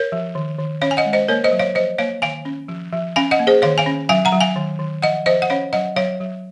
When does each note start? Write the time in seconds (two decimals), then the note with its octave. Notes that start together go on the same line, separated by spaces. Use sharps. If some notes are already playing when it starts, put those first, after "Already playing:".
Already playing: A#4 C#5
0.12 F3
0.35 D#3
0.58 D#3
0.82 C#4 C#5 F5
0.91 G#5
0.97 D#5 F#5
1.06 G#3
1.13 C5 D#5
1.28 A#3 A#4 C#5
1.44 C5 D#5
1.52 F#3
1.59 C#5 F5
1.75 F3 C5 D#5
1.98 A#3 C#5 F5
2.22 D#3 F5 G#5
2.45 C#4
2.68 F3
2.93 F3
3.16 C#4 F5 G#5
3.31 D#5 F#5
3.39 A#3
3.47 G#4 C5
3.62 D#3 C#5 F5
3.78 F5 G#5
3.86 C#4
4.09 F#3 F5 G#5
4.25 F#5 A#5
4.33 F#3
4.41 F5 G#5
4.56 D#3
4.79 D#3
5.02 F3 D#5 F#5
5.26 F3 C5 D#5
5.42 F#5
5.50 C#4 C#5 F5
5.73 F#3 D#5 F#5
5.96 F#3 C#5 F5
6.20 F#3